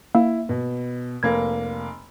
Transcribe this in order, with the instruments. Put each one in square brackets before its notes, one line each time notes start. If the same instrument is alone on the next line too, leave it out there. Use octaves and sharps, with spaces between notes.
[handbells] A#3 [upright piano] E4
[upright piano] B2
[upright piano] F1 A#3 [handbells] G#6